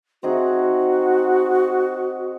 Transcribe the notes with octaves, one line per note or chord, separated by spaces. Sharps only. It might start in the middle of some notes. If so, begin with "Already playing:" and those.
C4 D#4 F#4 G#4